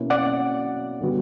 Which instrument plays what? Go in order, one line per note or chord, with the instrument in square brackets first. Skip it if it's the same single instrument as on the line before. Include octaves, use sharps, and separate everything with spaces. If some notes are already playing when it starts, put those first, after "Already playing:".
Already playing: [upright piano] B2 A#3 C#4 E4
[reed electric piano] D5 F#5
[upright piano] D3 G3 B3 F#4